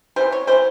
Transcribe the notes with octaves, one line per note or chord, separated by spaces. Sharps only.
C3 E3 G3 C5
C#5
C3 E3 G3 C5